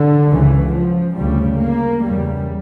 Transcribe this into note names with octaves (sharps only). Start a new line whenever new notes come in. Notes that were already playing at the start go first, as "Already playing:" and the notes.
Already playing: D3
C#2 C#3 E3
F3
D2 C#3 G3
A#3
E2 C#3 G3